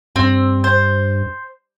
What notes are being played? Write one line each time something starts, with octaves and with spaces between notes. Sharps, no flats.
G2 C4
C5